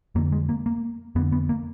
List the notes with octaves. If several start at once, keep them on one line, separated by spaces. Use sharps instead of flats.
F2 D3 A#3
G#3
A#3
A#3
F2 D3 B3
B3
A#3